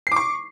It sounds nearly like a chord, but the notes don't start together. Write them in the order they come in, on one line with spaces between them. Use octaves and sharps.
C7 D6 C#6